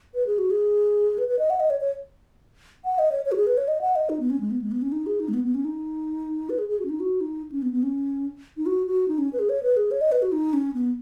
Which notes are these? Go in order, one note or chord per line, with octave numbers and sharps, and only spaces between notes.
B4
G#4
F#4
G#4
B4
B4
D#5
F#5
D#5
C#5
C#5
F#5
D#5
C#5
C#5
F#4
G#4
B4
C#5
D#5
F#5
D#5
D#4
B3
C#4
G#3
B3
G#3
B3
C#4
D#4
G#4
D#4
G#3
B3
B3
C#4
D#4
B4
G#4
G#4
F#4
C#4
D#4
F#4
D#4
C#4
B3
B3
C#4
D#4
F#4
F#4
D#4
C#4
B4
G#4
C#5
B4
G#4
C#5
D#5
B4
F#4
D#4
C#4
B3